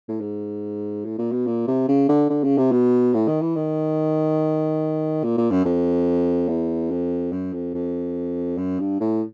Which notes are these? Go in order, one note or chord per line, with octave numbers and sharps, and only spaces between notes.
A2
G#2
A2
A#2
B2
A#2
C3
C#3
D3
D3
C#3
C3
B2
A2
D#3
E3
D#3
A#2
A#2
F#2
F2
E2
F2
F#2
F2
F2
F#2
G2
A2